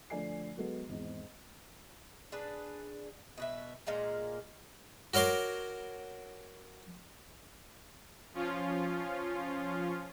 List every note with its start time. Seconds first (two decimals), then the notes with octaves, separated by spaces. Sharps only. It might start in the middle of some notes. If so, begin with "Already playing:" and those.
0.10 D3 F3 A3 D5 G#5 C7
0.57 F#3 G#3 B3 F#4 A4 B4
0.89 G#1 E2 G#2
2.32 D4 G#4 B4
3.38 B2 B4 E5
3.87 A#2 G#3 F5 A#5
5.14 F#4 A#4 C#5 C6 D6
8.34 F3 C#4 F4